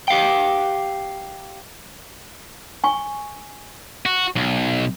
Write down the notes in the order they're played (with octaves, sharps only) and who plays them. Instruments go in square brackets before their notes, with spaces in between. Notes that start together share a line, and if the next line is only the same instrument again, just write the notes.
[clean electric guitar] G4 F5 G5
[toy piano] G#5 C#6
[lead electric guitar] F#4
B1